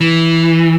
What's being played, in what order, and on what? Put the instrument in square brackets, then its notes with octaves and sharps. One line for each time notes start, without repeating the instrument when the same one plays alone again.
[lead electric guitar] E3